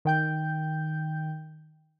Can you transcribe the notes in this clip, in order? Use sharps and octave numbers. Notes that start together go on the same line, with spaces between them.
D#3 G5 G6